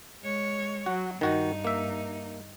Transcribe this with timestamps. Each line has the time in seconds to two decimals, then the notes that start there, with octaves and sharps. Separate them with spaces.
0.21 G#3 C#5
0.86 F#3 F#4
1.21 G2 D#3 D#4 F#4 F#5
1.65 A#3 E5